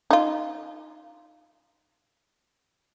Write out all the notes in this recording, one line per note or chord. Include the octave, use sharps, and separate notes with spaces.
D#4 F4